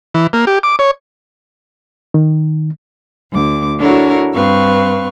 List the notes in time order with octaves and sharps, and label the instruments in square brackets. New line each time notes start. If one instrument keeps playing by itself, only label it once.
[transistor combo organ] E3
A#3
G4
D6
C#5
[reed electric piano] D#3
[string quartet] D2 D6
D4 E4 F#4 A4 A#4 C#5
G2 C4 B4 F5 C#6